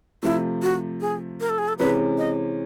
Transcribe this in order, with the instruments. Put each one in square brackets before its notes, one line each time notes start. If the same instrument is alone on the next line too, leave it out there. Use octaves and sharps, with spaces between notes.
[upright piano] C3 F3 A3 [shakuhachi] E4
[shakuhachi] F#4
G#4
A#4
A4
G#4
A4
[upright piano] C3 E3 G#3 C#4 [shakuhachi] B4
[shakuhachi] D#5